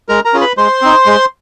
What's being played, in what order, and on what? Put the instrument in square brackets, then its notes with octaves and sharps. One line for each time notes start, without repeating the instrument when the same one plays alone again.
[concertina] G#3 A#4 A#5
A#4 A#5
C#4 F4 G#4
B4 B5
G#3 C5 C6
C4 D#4
G#3